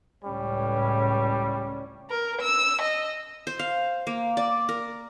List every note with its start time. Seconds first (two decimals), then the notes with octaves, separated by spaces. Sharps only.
0.24 C#2 A2 G3 C#4
2.10 A#4
2.42 E6
2.81 D#5
3.47 C5
3.59 F5
4.07 A#3
4.37 D5
4.69 A#4